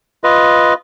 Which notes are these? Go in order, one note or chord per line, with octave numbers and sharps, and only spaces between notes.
F4 B4 D#5